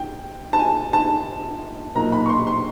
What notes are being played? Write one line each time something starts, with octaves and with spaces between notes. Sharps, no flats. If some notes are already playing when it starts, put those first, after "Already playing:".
Already playing: G5
A5
G#5
A5
B1 A#2 F#3 A#3 A#5
B5
C#6
C6
C6